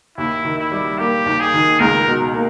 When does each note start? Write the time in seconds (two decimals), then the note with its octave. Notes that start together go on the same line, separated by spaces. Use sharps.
0.18 D#2 E4
0.45 D#3
0.58 E4
0.72 G3
0.99 A#3 G4
1.26 D#2
1.40 G#4
1.54 D#3
1.80 C#2 A#4
2.07 B2
2.34 A#3